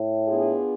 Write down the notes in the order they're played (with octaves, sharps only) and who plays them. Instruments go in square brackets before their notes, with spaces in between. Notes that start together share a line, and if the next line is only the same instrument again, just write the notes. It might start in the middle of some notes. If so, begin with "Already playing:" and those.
Already playing: [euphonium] A2
[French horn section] B3 D4 F4 G#4